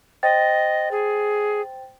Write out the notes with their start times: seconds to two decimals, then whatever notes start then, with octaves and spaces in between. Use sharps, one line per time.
0.23 C5 D#5 G5 A6
0.91 G#4